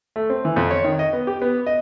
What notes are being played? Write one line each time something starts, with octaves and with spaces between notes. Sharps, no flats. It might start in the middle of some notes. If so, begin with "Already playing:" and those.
A3
C4
E3
F2
C#5
D#3
D#5
B3
G4
B3
D#5